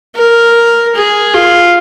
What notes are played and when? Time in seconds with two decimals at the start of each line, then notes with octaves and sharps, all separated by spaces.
0.16 A#4
0.95 G#4
1.34 F4